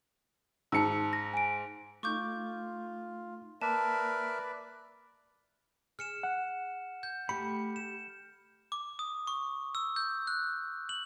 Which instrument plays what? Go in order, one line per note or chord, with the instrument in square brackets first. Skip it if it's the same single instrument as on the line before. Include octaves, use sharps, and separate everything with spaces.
[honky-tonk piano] G#2 C#7 [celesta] A5 E6
[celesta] A#6
G#5 D7
[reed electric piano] A3 D#4 [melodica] F4 [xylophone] C#6 D6 G6
[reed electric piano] A#3 [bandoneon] A#4 E5 [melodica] B4 D5 [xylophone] A5
[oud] G#4 [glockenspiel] F6 C#7 E7
[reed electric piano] F#5
[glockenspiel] G6
[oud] A3 A4 [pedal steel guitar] G4 B5 [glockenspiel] C#7
[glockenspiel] E7
D6
D#6
C#6
E6
G6
F#6
F#7